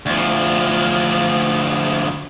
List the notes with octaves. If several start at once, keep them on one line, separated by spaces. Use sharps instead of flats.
D2 F3